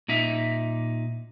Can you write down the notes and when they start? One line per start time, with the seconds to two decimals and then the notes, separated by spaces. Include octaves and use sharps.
0.08 A#2 D#4 E5